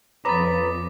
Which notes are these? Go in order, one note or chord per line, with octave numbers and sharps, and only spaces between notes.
F2 B3 C#4 A#5 B5 D6 D#6 A6